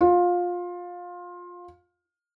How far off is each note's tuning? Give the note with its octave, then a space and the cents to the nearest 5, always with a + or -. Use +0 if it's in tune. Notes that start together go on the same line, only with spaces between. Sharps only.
F4 +20